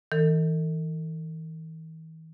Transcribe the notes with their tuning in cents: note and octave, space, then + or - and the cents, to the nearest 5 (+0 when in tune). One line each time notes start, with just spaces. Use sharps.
E3 -45 A4 +45